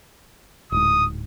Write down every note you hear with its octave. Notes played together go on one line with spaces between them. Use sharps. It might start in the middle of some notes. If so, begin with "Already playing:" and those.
D1 G#2 D#6